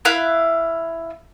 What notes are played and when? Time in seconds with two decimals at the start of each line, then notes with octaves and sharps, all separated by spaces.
0.05 E4 E5 F5 F#6